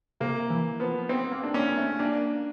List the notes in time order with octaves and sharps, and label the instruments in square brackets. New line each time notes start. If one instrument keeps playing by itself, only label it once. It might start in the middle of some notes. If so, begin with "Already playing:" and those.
[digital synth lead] C3 [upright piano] A#3
[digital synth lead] E3
[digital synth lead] F3 [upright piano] B3
[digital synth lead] B3 [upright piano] C4
[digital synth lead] A#3
[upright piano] D4
[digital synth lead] A#3 [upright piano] C#4
[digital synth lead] A3
[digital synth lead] A#3 [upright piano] D4